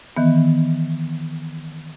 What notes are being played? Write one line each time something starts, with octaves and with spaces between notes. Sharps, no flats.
D#3 E3 B3